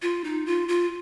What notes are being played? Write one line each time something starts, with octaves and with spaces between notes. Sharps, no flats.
F4
D#4
F4
F4